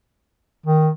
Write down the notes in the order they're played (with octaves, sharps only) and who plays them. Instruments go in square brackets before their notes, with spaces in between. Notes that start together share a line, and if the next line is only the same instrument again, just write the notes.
[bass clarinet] D#3